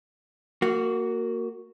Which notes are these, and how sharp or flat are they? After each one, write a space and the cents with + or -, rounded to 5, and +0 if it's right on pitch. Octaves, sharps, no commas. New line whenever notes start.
A#3 -20 F#4 +0